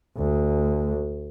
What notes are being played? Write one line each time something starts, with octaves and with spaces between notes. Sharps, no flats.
D2